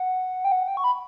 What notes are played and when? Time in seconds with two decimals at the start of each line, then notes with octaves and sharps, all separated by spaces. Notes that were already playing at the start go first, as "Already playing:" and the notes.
Already playing: F#5
0.45 G5
0.52 F#5
0.68 G5
0.77 C#6
0.84 B5